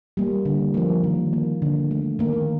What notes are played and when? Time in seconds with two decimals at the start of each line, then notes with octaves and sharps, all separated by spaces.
0.17 G3 A#3
0.45 D3
0.74 F3 A#3
1.04 D#3
1.33 A#3
1.62 D3
1.91 A3
2.19 D#3 A#3